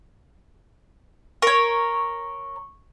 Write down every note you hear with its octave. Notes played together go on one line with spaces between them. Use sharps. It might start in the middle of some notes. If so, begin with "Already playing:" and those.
A#4 C#5 C#6